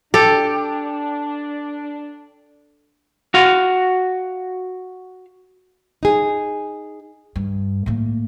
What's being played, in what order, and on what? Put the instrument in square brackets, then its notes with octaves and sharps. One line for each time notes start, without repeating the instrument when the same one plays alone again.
[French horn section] D4 [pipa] G4 [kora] A4
[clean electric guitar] F#4 F5
[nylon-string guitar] D#4 G#4
[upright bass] G2
A2 A#3